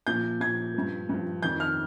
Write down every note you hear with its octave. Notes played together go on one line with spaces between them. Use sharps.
A#2 F3 G6
A#2 F3 G#6
G2 F3
G2 F3
F2 D#3 G6
F6